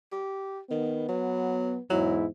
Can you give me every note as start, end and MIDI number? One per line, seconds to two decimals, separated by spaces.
0.12 0.59 67
0.71 1.04 51
0.71 1.78 59
1.09 1.77 54
1.90 2.26 40
1.90 2.26 44
1.90 2.19 54
1.90 2.26 64